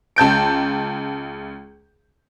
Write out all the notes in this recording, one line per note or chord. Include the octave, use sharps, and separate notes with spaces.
C#2 A5 G6 D7